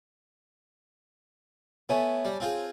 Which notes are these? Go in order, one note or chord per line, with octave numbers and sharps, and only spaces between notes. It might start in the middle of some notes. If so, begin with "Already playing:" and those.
A3 B3 C#5 G#5 A5
G3
C4 F4 G#4